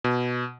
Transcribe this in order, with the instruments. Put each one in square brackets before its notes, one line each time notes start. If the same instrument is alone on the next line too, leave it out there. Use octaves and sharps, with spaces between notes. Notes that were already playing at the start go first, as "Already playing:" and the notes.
[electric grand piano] B2